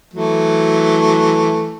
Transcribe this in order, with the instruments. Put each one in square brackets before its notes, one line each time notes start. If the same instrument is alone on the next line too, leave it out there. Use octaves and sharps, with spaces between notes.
[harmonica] E3 F#3 A3